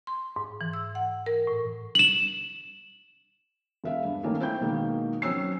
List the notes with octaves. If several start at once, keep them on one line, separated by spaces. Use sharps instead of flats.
C6
G#2
E3
E6
F#5
A#4
A2
E7 F#7
E1 E5 F5
G2
D#3 A3 A#3 C#4
C4 E4 G5 G6
B2 D#3 G#3 A#3
F#3 C4 C#4 E6 C7